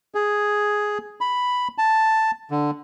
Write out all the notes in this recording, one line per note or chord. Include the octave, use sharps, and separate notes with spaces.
G#4
B5
A5
D3